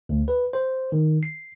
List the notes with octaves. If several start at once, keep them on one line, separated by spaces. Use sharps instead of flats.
D2
B4
C5
D#3
C7